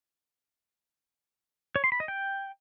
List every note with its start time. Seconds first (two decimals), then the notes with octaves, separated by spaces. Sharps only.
1.76 C#5
1.84 C6
1.92 B5
2.00 D#5
2.08 G5